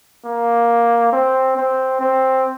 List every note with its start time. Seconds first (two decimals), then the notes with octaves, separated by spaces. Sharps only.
0.25 A#3
1.13 C4
1.57 C4
2.01 C4